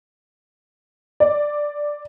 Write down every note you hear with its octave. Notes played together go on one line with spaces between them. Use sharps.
D5